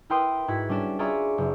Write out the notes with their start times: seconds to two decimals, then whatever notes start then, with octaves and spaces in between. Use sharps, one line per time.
0.10 E4 A#4 B4 G5 C6 D#6
0.48 G#2 E4 F#4 G#6 B6
0.69 G3 C#4 D4 D5 E7
0.99 F4 G#4 D5 E5 A#5 C#6
1.38 F#1